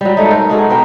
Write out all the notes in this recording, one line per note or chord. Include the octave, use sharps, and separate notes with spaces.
F#3 G3
A3 D#4
A4 A#4 C5
D#4 F#4 G#4 A4
B2 B3 A#4 G5